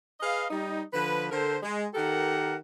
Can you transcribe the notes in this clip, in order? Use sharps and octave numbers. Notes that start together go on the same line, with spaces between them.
G#4 B4 D#5 F5
G3 D#4
D3 F3 B4
D3 A4 A#4 C5
G#3
D#3 G4 A4 A#4 F#5